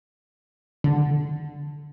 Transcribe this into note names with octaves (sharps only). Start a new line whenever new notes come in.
D3